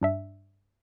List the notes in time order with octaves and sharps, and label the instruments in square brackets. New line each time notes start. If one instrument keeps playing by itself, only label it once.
[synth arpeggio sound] G2 D4 E5